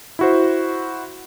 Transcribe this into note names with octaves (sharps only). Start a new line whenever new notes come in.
E4 F#4 C5